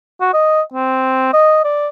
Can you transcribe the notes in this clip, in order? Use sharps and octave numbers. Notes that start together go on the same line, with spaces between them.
F#4
D#5
C4
D#5
D5